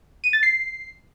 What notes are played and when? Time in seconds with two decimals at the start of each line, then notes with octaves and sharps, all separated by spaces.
0.24 D#7
0.33 A6
0.43 C7